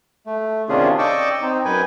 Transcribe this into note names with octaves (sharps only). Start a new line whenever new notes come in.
A3
C3 D#3 C#4 D4 F4 G#4
D5 D#5 G5 C#6 D6 E6
C4 D#4
F#2 B4 G5 G#5